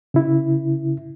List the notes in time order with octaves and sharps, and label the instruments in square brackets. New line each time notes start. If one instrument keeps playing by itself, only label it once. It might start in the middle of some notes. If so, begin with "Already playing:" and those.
[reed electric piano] C#3 E4